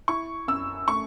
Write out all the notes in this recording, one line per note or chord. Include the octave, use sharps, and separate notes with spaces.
E4 C#6
F#2 E6
A3 C#6